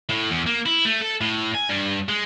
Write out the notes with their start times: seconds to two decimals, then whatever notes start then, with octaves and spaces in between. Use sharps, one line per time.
0.10 A2
0.30 E2
0.46 A#3
0.66 E4
0.85 A3
1.01 A4
1.21 A2
1.55 G#5
1.69 G2
2.09 G#3